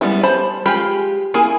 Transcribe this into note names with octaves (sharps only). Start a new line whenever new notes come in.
G3 G#3 B3 E4
C5 A5 B5
G#3 F4 G4 G5 B5
A#3 E4 G#4 G#5